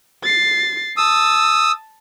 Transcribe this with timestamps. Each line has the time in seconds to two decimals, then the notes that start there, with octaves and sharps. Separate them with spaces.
0.23 A6 C7
0.97 A5 D#6 E6